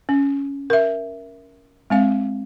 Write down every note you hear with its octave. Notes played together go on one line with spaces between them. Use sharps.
C#4
A#4 E5
G#3 C4 F5